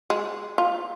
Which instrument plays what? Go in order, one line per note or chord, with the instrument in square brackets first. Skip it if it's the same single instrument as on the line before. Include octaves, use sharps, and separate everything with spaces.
[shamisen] G#3
F4